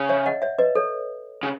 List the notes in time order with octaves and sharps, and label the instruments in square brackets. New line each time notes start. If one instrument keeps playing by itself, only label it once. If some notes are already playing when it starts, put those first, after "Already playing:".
Already playing: [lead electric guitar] C#3
[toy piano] C#5 E5
D#5 F#5
C#5 E5
B4 D#5
A4 C#5
[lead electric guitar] C#3